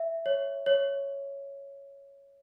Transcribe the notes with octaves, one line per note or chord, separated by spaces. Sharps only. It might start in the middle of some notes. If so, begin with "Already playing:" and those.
Already playing: E5
C#5
C#5